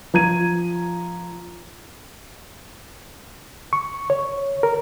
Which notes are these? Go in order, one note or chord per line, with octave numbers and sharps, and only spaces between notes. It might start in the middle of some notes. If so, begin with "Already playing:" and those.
F3 A#5 G#6 D#7
C#6
C#5
A#4